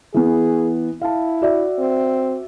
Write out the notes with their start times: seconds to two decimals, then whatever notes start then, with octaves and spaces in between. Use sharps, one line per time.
0.14 E3 B3 G#4
1.02 E4 F5 A5
1.42 F#4 D5 E5
1.79 C4